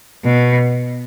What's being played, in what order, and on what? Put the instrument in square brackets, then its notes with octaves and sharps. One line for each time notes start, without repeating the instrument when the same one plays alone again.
[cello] B2